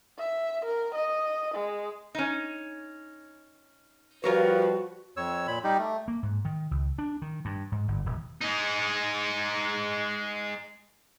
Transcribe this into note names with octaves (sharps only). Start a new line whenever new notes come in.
E5
A#4
D#5
G#3
C#4 D#4
F3 G3 F4 F#4 A#4 B4 C#5
F2 C#5 E6
A#2 B5
G3 D#4 G4
A3
A#3
G#2
D#3
C#2
D4
D#3
G2
G#2
G1
D#1
G#3 D#4